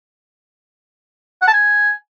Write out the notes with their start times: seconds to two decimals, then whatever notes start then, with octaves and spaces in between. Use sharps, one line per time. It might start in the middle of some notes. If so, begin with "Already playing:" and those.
1.42 F#5
1.48 A5
1.53 G#5